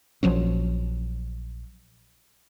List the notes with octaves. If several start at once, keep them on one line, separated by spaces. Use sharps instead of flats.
A#1 F3 F#3 C#4